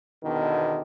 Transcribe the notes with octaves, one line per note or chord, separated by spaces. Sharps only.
E2 B2 D3 D#3